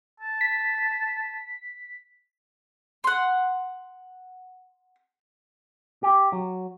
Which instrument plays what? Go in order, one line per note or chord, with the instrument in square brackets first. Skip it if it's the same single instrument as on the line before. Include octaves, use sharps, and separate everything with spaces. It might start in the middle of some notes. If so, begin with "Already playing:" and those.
[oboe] A5
[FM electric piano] B6
[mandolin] F#5 C6
[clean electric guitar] G4
F#3